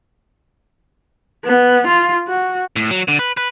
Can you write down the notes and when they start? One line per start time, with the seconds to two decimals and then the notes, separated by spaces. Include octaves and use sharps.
1.45 B3
1.87 F4
2.28 F#4
2.76 A2
2.91 F#3
3.08 D3
3.19 B4
3.37 B4